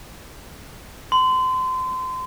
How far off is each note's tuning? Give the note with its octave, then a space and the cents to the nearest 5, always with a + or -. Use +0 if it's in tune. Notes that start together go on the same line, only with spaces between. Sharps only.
C6 -30